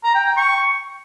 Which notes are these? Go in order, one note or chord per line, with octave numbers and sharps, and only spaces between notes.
A#5
G5
G5
C#6